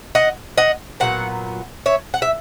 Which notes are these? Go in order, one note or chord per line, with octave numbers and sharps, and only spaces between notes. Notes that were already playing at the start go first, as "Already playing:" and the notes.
D#5 F#5
D#5 F#5
A#2 F#3 B3 F#5
C#5 E5
F#5
E5